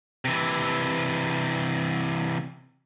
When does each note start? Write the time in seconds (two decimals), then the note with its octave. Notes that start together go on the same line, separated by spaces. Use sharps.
0.25 C3 E3